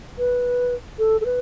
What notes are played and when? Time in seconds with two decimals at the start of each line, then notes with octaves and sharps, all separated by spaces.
0.18 B4
0.99 A4
1.21 A4
1.25 B4